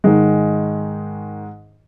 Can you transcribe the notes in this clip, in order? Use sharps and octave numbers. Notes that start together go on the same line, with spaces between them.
G#2 D#3 G#3